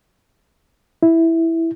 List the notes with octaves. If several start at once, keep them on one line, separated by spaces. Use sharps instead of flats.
E4